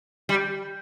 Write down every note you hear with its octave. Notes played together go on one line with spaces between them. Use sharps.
G3